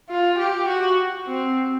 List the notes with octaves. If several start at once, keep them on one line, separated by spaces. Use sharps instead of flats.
F4
G4
F#4
C4